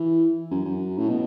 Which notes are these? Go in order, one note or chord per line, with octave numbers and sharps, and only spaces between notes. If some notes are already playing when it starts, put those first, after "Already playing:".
Already playing: E3
F#2
F#2
A2
B2